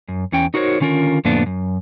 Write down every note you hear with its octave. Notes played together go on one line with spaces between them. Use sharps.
F#2
E2 C#4 G5
D#4 F#4 A#4 C5 C#5
D3 D#3 C#4 F4 A#4
F2 A2 D3 A#3 B3 D4
F#2